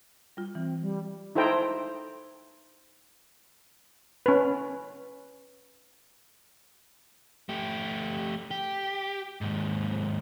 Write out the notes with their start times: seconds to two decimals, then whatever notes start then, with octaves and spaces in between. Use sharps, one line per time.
0.37 G3 F4
0.55 E3 C4
0.81 G3
1.35 D#4 E4 A4 C5 G5 A#5
4.26 C#4 B4
7.49 A3 G4
8.51 G4
9.41 D#2 G#2